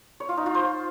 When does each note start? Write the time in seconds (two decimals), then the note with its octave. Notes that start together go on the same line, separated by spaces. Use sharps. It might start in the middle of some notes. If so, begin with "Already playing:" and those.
0.20 C#5
0.29 F4
0.37 D#4
0.46 F4
0.54 C5